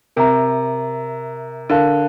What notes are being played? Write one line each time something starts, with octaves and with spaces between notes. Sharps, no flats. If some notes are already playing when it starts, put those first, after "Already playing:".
C3 A#4 E5 A#5
D3 A#4 F5 A5